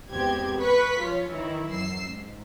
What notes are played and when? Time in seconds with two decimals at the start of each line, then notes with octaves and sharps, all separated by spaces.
0.11 E2 G#2 B3 C4 G4 G#6
0.61 B4 C#6 B6
1.00 F3 F4 C#5
1.31 D#3 E3 E4
1.70 F#2 E6 C7
2.09 G#2